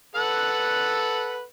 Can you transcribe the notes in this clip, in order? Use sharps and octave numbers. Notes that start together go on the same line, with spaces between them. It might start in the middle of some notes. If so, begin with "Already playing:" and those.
A4 B4 F#5